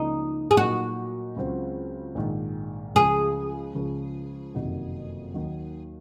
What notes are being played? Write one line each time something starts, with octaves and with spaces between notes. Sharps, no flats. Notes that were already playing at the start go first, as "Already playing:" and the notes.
Already playing: C#2 C#3 F3 A#3 D#4
G#4
A#2 F#3 A#3 D#4 F#4
C#2 C#3 F#3 C4 F4
A#1 G#2 D#3
C#2 C#3 F3 G#4
C#2 C#3 F3
F#1 F2 C3 D#3 F#3
D#2 D#3 F#3